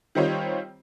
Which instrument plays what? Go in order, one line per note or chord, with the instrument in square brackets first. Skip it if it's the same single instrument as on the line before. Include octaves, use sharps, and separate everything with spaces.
[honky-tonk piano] D#3 G3 C4 D#4 F4 C#5